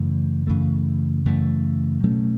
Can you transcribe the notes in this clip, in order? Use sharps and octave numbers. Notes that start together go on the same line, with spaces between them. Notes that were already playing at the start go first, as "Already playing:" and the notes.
Already playing: F#2 C#3 E3 A3
F#2 C#3 E3 A3
F#2 C#3 E3 A3
B2 F#3 A3 C#4